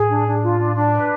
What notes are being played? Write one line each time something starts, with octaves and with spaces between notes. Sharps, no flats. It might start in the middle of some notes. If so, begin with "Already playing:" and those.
Already playing: A2 G#4
D4
D4
F4
D4
D4
B4